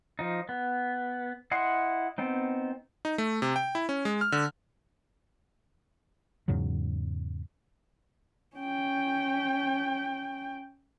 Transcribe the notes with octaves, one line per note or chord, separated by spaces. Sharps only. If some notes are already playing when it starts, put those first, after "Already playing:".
F3 D#4
B3
E4 D#5 F#5 C6
B3 C4 D#4
D#4
A3
C3
G5
E4
C#4
G#3
F6
D3
E2 G#2 C#3 F#3
C#4 G5